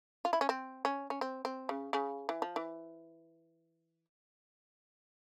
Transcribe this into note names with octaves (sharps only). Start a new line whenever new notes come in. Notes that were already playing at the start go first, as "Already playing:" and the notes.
F4
E4
C#4
C4
C#4
C#4
C4
C4
C#3
C#3
E3
F3
E3